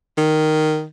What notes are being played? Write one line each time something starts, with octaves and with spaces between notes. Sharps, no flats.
D#3